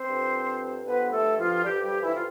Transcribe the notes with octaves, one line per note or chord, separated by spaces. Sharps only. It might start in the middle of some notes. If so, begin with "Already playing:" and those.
Already playing: C4 C5
G2 D3 F3
G2 D3 F3 B3 B4
A3 A4
F3 F4
G2 D3 F3 G3 G4
G3 G4
E3 E4
F4